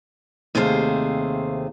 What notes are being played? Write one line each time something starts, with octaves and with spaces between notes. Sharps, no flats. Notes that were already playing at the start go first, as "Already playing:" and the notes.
D#2 C3 A3 G#4 C5 F5